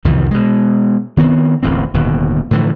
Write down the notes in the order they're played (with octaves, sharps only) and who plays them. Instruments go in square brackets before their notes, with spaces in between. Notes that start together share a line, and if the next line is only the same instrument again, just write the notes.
[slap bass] C2 F2 D#3 E3
B2 G#3
D#3 B3 C4
D1 A1 E2 C4
D1 D#2 B2
A2 D3 E3 F3